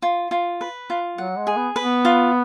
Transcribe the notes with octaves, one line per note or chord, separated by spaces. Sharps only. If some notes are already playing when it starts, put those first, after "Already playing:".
F4
F4
B4
F4
F#3 F#5
G#3
G#4
B3
B4
B3
F4